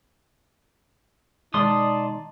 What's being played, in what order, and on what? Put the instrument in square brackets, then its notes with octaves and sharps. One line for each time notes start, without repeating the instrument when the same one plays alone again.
[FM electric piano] B2 D#3 G#3 [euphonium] D#4 [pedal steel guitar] D5 C6 D#6 [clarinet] A5